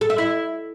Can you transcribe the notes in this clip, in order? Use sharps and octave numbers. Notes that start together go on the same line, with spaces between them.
A4
E5
E4